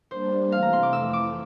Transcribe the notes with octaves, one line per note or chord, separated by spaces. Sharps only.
G3 A#3 D4 C5
C3 E3 A3 C4 F5
A#5
C6
D6
F2 E3 A3 E6
D6